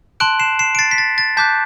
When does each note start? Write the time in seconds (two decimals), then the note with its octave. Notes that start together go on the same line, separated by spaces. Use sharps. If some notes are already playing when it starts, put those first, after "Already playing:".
0.20 A5 C6 F#6 D7 F#7
0.39 C7 E7
0.59 C7 E7
0.75 D7
0.79 A6 C7
0.91 B6
0.98 A6
1.18 A6
1.37 A5 D6 F#6 G6 B6